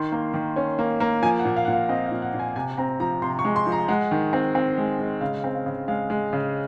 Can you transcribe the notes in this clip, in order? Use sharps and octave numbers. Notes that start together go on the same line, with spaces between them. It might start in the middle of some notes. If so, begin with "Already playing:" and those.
Already playing: D#3 C6
A#3
D#3
C#4
A#3
A#3
F3 G#5
F#5
A#2
F5
A#2 F#5
F5
C4 D#5
F5
A#2
F#5
A#2
G#5
C3 G#5
C4 A#5
F3 A#5
C3 C6
C#6
G#3
C6
F3
A#5
G#3 F#5
D#3
C4
C4
G#3
G#3
C#3 F5
C4
F5
C#3
G#3 F5
G#3
C#3